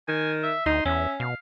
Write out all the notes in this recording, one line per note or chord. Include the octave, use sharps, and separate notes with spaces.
D#3 G#5
E5
D2 D#4 C6
E2 C#4 E5
B2 F5